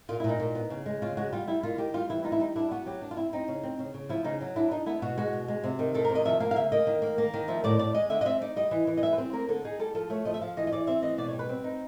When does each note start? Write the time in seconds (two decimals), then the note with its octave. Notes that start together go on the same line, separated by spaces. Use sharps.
0.09 A#2 F4
0.20 E4
0.24 A#2
0.29 D#4
0.40 A#2
0.55 B3
0.70 C#3
0.86 G#3
1.02 C#3 F4
1.17 G#3 F#4
1.33 G3 F4
1.47 G3 E4
1.63 D#3 F4
1.78 D#3 G4
1.94 G3 F4
2.09 E3 E4
2.24 D#4 F4
2.32 E4
2.39 G3 D#4
2.56 D4 E4
2.71 B3 F#4
2.86 F#3 G4
3.02 D4
3.11 F4
3.17 C4 E4
3.33 C4 D#4
3.48 C#3
3.63 C4
3.79 C#3
3.94 C#3
4.09 F3 E4
4.24 C#3 D#4
4.41 F#3
4.56 D4 E4
4.71 D4 D#4
4.86 B3 E4
5.02 B2 F#4
5.18 G#3 F#4
5.33 B2
5.48 G#3
5.64 C3
5.79 D#3
5.94 D#3 A4
6.05 A#4
6.09 C3
6.15 D#5
6.25 F3 E5
6.40 A#3 F5
6.51 F5
6.56 C#3 E5
6.72 A#3 D#5
6.87 D#3
7.02 A#3
7.18 A#3
7.34 D#3
7.48 F3 E5
7.64 A2 D5
7.79 A2 D5
7.95 G#3 D#5
8.10 D3 E5
8.21 D#5
8.25 C4 E5
8.41 D#4 D5
8.56 G3 D#5
8.71 E3
8.87 E3
8.97 D#5
9.02 G3 E5
9.13 B4
9.17 C4 C5
9.33 A#3 A#4
9.49 D3 A4
9.64 D#4 G#4
9.79 G3 A4
9.95 F3 A4
10.10 A3 C#5
10.25 F3 D#5
10.34 E5
10.41 F3 F5
10.57 E3 D#5
10.67 D#5
10.72 E3 D5
10.87 C4 E5
11.02 E3 D#5
11.18 B2 D5
11.29 C#5
11.33 G3
11.39 B4
11.49 C4
11.64 D#4